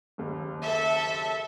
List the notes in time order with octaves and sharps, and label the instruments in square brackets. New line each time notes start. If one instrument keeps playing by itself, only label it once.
[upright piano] F#1 D#2 C#3
[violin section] A4 E5